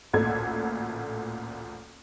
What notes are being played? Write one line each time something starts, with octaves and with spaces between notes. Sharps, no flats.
A1 D2 A#2 A4 G#6